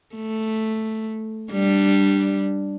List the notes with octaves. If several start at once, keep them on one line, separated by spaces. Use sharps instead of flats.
A3
G3 D4